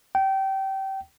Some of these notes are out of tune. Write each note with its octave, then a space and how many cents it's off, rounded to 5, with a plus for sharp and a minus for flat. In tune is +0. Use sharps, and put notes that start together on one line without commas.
G5 -25